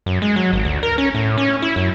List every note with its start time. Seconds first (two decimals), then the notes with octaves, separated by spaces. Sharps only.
0.06 F#2
0.22 G#3
0.36 F#3
0.53 G#1
0.65 D2
0.83 A#4
0.98 C#4
1.15 A2
1.38 C#4
1.62 E4
1.76 F#2